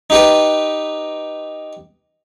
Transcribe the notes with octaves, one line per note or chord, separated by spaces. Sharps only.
D#4 G4 B4